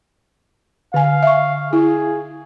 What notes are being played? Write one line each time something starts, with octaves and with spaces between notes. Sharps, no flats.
D3 F5 G#5
E5 C#6
E4 G#4